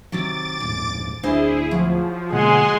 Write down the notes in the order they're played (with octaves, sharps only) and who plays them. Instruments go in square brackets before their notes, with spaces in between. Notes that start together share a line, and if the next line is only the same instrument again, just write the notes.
[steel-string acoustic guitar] C3 D#3 F#3 [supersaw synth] D6 A6
[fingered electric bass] D#1 A1 [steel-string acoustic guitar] G#2
[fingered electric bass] D1 [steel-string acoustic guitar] D4 C5 D#5 [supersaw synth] E4 G#4
[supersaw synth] F3 [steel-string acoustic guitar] F#3
[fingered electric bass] B2 D3 A#3 [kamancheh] G#3 [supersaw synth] F#5 G#5 C6